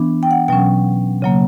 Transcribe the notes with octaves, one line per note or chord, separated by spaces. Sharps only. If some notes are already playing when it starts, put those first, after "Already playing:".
Already playing: E3 B3 D4
G5
F#5
B2 F#3 C#4 G5
C#3 F#3 A#3